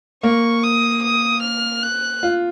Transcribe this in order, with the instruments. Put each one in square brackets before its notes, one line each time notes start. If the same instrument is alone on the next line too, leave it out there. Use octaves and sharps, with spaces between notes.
[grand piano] A#3 [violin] C#6
[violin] D#6
D#6
F6
F#6
[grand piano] F4